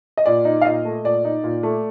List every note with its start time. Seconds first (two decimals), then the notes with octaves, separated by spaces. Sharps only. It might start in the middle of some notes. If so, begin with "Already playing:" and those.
0.17 D#5
0.26 A#2 D5
0.45 D#4
0.61 F5
0.65 A#2 D#5
0.85 A3
1.04 A#2 D5
1.25 D#4
1.44 A#2
1.63 A3